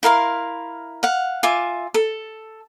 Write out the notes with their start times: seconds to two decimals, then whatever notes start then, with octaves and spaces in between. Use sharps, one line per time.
0.03 E4 A#4 F5 C6
1.03 F5 F#5
1.43 F4 E5 G#5 D6
1.94 A4